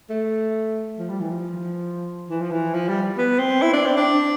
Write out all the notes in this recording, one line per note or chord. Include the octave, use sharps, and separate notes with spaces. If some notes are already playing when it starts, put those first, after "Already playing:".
A3
F3
G3
E3
F3
E3
F3
E3
F3
G3
B3
C4
E4
D4
C4
D4